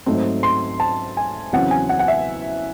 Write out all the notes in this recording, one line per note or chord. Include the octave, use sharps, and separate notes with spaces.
G#2 F#3 A3 C4 D#4
C6
A5
G#5
E2 C#3 F#3 C4 F#5
G#5
F#5
F#5
E5